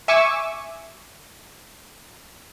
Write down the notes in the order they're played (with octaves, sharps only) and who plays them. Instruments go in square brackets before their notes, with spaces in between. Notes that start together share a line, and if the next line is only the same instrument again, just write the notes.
[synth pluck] E5 G#5 C#6 D6 E6